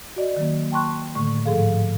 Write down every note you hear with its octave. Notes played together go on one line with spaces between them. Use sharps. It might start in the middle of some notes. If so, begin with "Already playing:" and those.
F#4 D5 D#5
D#3 F#3 A#3
G5 A5 C6 C#6 F#6
A2 D3 A3 C#6
G#2 F3 G#4 A4 F5